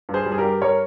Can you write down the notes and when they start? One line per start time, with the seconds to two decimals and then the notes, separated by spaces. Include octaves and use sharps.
0.09 G2
0.14 G#4 C5
0.26 G3
0.32 G#4
0.38 G4 A#4
0.44 G2
0.62 G3 A#4 C#5